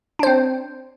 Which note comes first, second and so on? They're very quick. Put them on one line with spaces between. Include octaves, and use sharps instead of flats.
D4 C5 C4